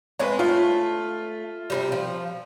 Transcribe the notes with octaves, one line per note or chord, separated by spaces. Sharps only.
G#3 C4 B4 C#5
A3 F4
C3 E3 G3
F3